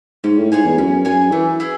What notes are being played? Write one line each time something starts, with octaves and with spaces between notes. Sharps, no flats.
G#2 C#4
A2
G#2 G#4 C#5 G#5
E2
F#2 C#4
F#2 G#4 C#5 G#5
E3 A3
E4 G#4